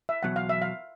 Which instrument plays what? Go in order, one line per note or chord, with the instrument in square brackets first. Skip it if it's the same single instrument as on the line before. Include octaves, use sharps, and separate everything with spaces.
[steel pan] E5
[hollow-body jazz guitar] E2 B2 F#3 [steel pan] F#5
[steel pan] F5
E5
F5